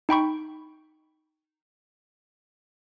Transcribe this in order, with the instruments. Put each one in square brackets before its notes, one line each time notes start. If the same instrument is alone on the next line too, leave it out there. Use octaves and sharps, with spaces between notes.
[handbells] D#4 G5 B5 C#6